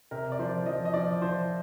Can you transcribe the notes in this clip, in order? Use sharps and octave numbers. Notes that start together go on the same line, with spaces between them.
C3 A#4
D5
F3 C5
F3 D#5
D#5
F3 D5
F3 C5